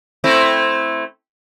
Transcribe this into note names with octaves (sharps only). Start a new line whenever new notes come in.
A3 C4 E4